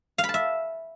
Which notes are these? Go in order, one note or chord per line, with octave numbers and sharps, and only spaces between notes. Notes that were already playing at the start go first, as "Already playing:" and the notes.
F5
B5
A5
E5